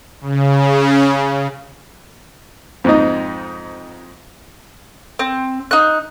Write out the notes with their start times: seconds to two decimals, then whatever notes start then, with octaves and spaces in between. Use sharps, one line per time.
0.21 C#3
2.84 F2 G#2 D#4
5.19 C4
5.71 D#4 F#6